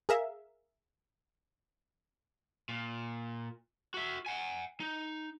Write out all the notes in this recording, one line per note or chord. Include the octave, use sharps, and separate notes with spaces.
G#4 A#4 E5 F5
A#2
F#4 E5
F#5 G#5
D#4